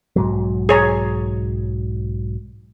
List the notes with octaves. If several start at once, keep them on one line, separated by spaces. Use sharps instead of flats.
B1 G#2 F#3
G#4 C#5 A#5